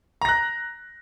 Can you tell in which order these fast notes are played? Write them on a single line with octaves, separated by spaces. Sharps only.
A#5 A#6 F#6